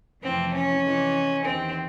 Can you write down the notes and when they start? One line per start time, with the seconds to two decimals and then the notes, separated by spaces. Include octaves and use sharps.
0.23 F2 C3 E3 A3 C4
0.54 C#4
0.84 C3 E3 G#3
1.45 E2 C3 D#3 C4